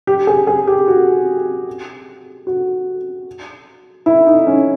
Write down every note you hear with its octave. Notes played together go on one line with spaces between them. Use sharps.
G4
G#4
G#4
G4
F#4
F#4
E4
D#4
C#4